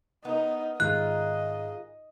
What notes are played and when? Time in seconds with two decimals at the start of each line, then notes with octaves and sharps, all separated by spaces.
0.25 B3 D#4 A#4
0.80 G#2 D#3 F4 G#4 A#4 D#5 F#6